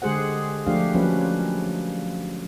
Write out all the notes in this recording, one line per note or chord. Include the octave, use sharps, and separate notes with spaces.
D3 G#3 G4 G#4 C5 F#5
F3 A3 D4 G4 F5
F3 F#3 A#3 C#4 B4